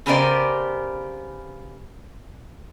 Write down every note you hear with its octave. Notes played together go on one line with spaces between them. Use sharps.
C#3 B3 G4 A#4 C5 D5